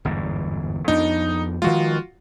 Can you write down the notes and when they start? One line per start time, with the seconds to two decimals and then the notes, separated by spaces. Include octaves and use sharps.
0.05 G1 E2 G#2
0.88 F2 B3 D4 D#4
1.62 D#3 F3 G#3 F4 F#4